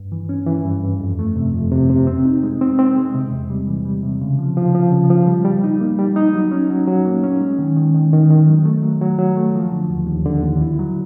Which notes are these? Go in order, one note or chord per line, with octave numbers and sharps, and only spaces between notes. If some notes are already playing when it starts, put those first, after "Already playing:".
Already playing: G2
E3
C#4
E3
G2
G2
F2
A3
C3
F2
C3
C3
C4
D#4
G#3
C4
C4
G#3
C3
E2
G3
E3
G3
C3
C#3
F3
F3
F3
C#3
F3
G3
G3
D#4
A#3
G3
D#4
F#3
C#4
F#3
F#3
A#3
C#4
G#3
D#3
D#3
D#3
D#3
D#3
F#3
A3
F#3
F#3
F#3
A3
F3
D3
D#2
D#2
D3
D#2
E4
F#3